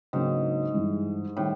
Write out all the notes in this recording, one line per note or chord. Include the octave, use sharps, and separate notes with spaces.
G#2 C#3 F#3 A#3 D4
G2 E3 G#3
A2 D#3 G3